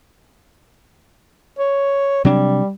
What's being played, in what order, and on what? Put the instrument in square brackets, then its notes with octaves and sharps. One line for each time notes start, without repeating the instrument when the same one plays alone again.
[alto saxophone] C#5
[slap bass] C3 F#3 D4 [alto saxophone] G3